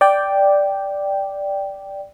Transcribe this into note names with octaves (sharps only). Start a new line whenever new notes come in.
D5 G5